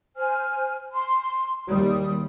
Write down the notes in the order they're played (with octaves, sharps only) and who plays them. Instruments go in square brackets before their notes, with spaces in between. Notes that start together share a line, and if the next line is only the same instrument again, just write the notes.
[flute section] C5 G#5 F6
C6
[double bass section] D#2 G3 [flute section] D#6